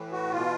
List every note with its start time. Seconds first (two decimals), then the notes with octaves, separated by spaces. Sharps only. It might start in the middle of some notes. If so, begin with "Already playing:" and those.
Already playing: A2 E3
0.12 F#4
0.31 B2 F4